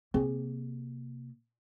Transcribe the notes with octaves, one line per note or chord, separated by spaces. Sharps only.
C3 A#3 C4 G#4